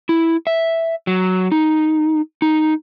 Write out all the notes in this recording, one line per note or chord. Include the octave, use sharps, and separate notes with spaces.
E4
E5
F#3
D#4
D#4